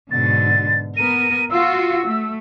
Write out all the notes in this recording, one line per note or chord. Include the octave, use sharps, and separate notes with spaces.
G#2 B2 D3 A6
B3 A#4 D#7
F4 F#4 E6
A3